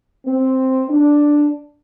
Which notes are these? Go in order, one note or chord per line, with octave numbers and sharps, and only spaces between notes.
C4
D4